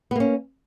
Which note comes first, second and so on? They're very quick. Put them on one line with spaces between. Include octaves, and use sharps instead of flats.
B3 A#3 C#4